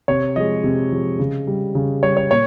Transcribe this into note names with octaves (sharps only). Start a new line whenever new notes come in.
C3 C#5
F3 G#3 D#5
C3
F3 G#3
C#3
G3
C#3
G3 C#5
C#5
A#2 C#5